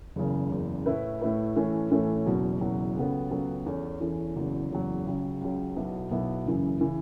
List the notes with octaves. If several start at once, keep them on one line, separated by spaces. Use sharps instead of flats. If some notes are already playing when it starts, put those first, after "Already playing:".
F#1 E2 C#3
F#1 E2 C#3
A2 A3 E4 B4
A2 A3 E4 B4
A2 E3 A3 C#4
A2 E3 A3 C#4
F#1 E2 B2 F#3
F#1 E2 B2 F#3
C#2 C#3 F#3 B3 A4
C#2 C#3 F#3 B3 A4
E2 E3 C#4 A4
E2 E3 C#4 A4
F#1 E2 C#3 F#3
F#1 E2 C#3 F#3
C#2 C#3 F#3
C#2 C#3 F#3
B1 B2 B3 E4
B1 B2 B3 E4
F#1 F#2 C#3 E3
C#3 E3